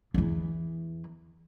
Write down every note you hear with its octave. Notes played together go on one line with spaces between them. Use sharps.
E2 E3